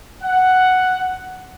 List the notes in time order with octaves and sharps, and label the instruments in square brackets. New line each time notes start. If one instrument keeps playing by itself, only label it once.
[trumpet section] F#5